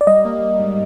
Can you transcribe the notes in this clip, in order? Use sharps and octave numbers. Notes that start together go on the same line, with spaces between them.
D5
G3 D#5
A#3
A#3
G#2